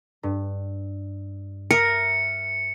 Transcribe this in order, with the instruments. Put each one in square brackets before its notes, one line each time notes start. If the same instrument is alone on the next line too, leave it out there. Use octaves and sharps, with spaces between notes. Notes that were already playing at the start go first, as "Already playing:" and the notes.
[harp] G2
[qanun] A#4 [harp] E5 D#6 [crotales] C#7